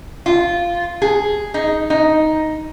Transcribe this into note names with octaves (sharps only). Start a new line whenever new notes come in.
F4
G#4
D#4
D#4